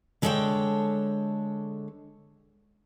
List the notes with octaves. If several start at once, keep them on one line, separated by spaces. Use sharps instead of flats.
D3 G#3 D4 A4 C#5 G5